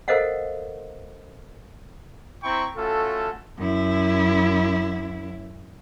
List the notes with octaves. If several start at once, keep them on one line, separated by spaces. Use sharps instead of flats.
A4 A#4 C5 D#5 F5 F#5
C4 E4 G5 A#5 B5 C#6
A3 C#4 F4 F#4 A4
F#2 E4